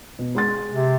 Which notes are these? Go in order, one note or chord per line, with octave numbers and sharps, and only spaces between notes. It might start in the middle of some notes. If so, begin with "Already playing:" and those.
B2
G#3 C6 A6
C3